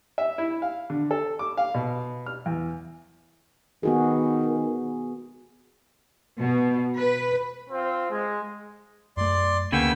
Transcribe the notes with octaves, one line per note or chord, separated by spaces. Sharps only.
E5
E4
F5
D3
A4
D6
F5
B2
F6
E2
D#3 B3 F#4 G#4
B2
B4
C4 F4
G#3
F#2 A3 D5 C6
D2 C#3 A#3 B3 G5 E6